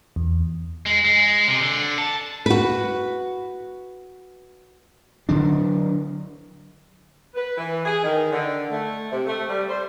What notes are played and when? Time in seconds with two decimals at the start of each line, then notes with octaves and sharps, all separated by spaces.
0.16 E2
0.86 G#3
1.05 G#3
1.48 C3
1.60 D3
1.98 A5
2.46 F#4 B4
5.29 D3 F#3 D4
7.35 B4
7.57 E3
7.85 G#4
8.03 D#3
8.31 D3
8.71 A3
9.11 C3
9.26 A3
9.49 G3
9.69 C5